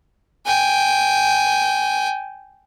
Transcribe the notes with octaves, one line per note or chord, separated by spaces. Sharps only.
G5 G#5